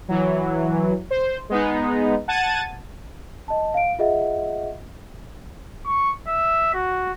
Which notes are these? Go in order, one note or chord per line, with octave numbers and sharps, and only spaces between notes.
E3 F#3
C5
G#3 B3 D#4
F#5 A5 G#6 A6 D#7
D#5 A5
F5 D7
F4 G#4 D#5 E5 F#5
C#6
E5
F#4